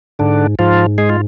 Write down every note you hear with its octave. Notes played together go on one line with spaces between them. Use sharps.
G#2 D3 D4
G#2 F3 F4
G#3 G#4
F4